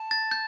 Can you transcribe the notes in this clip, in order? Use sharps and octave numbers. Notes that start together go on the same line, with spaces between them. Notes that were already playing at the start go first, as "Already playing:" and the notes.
Already playing: A5
A6
G6